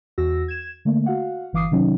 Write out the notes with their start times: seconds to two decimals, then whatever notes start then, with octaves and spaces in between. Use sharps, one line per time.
0.18 E2 F#4 E6 A#6
0.48 G#6 E7
0.85 D3 A3 A#3
1.06 F#4 F5 F#5
1.53 G1 E3 F5 D6 D#6 C7
1.71 C3 D#3 F#3 C#4 D#4